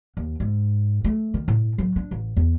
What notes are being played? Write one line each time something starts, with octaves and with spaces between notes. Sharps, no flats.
D#2
G#2
A3
D#3
A2
F#3
D4
A1
E2